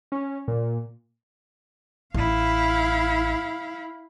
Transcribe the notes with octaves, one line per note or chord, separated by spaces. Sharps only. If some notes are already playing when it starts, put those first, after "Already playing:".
C#4
A#2
A1 E4 F5